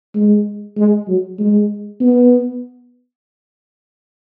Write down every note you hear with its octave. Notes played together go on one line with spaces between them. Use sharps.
G#3
G#3
F#3
G#3
B3